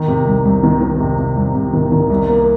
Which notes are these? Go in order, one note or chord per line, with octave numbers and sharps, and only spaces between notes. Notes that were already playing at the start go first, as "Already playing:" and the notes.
Already playing: D#3
C3
C2
C2
D#3
D#3
C3
C3
C2
C3
D#3
D#3
C2
A#3